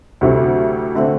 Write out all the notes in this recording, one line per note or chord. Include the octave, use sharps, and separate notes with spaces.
D2 C3 F#3 A3 E4
D3 A3 C4